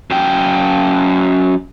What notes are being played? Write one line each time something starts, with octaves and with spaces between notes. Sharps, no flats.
F#2 G5